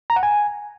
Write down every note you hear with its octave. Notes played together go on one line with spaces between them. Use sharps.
A#5
F#5
G#5